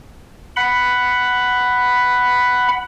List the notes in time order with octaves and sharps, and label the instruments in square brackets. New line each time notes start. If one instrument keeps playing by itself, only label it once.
[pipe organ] F#5 B5